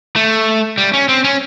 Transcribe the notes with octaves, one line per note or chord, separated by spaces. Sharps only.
A3
G3
C#4
C4
C#4